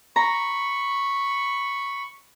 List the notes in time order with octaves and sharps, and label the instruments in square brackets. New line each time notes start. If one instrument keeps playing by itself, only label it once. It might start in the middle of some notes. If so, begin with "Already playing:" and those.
[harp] A#5 [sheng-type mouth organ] B5 C#6